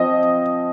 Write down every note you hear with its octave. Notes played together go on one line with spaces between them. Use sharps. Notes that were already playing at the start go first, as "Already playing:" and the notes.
Already playing: F3 C4 D#5